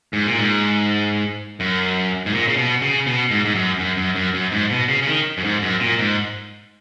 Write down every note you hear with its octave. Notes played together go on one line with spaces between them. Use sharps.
G#2
A#2
G#2
F#2
G#2
A#2
C#3
B2
C#3
B2
G#2
G#2
F#2
F#2
F#2
F#2
F#2
G#2
B2
C#3
C#3
D#3
F#2
G#2
F#2
A#2
G#2